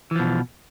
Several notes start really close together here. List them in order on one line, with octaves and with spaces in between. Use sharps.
E3 F3 B2